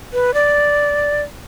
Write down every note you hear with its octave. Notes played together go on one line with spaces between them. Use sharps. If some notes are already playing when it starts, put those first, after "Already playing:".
B4
D5